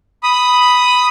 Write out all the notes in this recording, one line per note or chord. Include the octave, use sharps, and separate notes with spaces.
B5 D#6